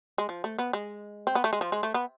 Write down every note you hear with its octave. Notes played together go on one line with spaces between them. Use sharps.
G#3
F3
A3
B3
G#3
C4
B3
A3
G#3
F3
G#3
A3
B3